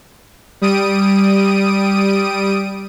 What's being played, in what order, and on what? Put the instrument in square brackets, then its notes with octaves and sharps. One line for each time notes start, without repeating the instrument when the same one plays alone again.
[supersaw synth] G3 D#6 D7 D#7